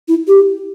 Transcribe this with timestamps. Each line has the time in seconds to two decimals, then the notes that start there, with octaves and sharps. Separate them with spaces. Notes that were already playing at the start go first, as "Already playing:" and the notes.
0.08 E4
0.28 G4